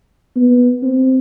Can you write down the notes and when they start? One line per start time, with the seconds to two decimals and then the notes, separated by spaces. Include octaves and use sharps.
0.36 B3
0.83 C4